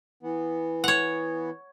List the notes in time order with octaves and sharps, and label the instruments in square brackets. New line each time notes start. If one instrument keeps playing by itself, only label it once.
[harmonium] E3 B3
[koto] C#5 F#5